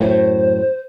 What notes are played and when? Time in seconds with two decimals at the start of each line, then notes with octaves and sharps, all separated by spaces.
0.01 F#2 A2 C5